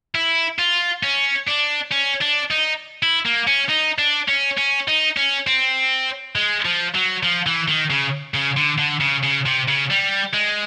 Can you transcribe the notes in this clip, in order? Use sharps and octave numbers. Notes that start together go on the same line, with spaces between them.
E4
F4
C#4
D4
C#4
D4
D#4
E4
A#3
C#4
D#4
D4
C#4
C#4
D#4
C#4
C4
G#3
F3
F#3
F3
E3
D#3
C#3
C#3
D3
D3
C#3
C#3
C3
C#3
G3
G#3